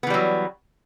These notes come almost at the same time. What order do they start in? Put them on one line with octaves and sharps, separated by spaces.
B3 E3 G3 F#3